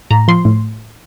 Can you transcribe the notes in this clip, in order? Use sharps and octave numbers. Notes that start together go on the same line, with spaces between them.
A2 A#5
F3 C6
A2